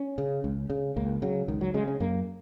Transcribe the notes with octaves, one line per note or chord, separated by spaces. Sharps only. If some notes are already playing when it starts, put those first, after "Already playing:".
Already playing: C#4
C#3
C#2
C#3
C#2 A#3
C#3 F#3
C#2 D#3
F#3
C#3 G#3
C#4
F#2 A#3